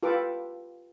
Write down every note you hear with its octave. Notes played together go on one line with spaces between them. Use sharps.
F4 G4 A4 B4 D6